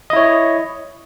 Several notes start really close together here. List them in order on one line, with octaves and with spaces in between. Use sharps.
D#5 E4 C#5